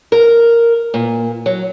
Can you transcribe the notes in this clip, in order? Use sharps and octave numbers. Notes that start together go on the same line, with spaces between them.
A#4
A#2
F#3